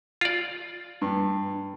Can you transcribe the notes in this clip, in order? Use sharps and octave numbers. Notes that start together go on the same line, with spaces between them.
F4 D5
G2